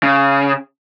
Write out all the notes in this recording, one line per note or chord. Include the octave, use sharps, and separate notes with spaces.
C#3